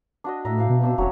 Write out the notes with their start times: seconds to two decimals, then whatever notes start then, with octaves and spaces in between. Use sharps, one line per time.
0.24 D4 F#4 D#5
0.45 A2 E5 A#5
0.58 E5 F5 G5
0.70 B2
0.82 C4 D4 E6
0.98 E1 F#3 C#4 C#5